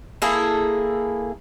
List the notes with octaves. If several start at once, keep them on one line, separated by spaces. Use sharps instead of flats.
A#3 E4 G#4 A4